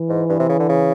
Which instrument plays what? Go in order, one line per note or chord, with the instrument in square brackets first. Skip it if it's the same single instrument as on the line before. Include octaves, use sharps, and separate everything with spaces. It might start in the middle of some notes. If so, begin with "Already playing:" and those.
Already playing: [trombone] E3
[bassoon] G#2
G2
C3
C#3
D3
C#3